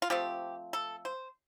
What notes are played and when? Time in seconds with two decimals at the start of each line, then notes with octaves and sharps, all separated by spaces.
0.02 F4
0.10 F3 A3 C4 G4
0.73 A4
1.05 C5